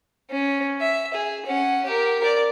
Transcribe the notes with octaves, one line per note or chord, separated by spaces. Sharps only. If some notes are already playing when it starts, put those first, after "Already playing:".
C#4
E5
G#4
C#4 F#5
G4 A#4
A#4 D5